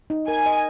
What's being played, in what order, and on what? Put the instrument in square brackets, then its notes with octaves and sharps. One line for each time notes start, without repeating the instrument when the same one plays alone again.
[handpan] D#4
[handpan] A#4 [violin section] G#5
[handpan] D#5